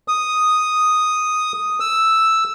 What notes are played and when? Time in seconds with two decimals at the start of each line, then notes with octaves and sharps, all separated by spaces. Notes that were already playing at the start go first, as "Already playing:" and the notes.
0.08 D#6
1.80 E6